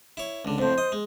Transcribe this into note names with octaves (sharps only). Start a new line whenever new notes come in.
E4 C#5
C#2 D3
F2 A2 C5
D#5
G#3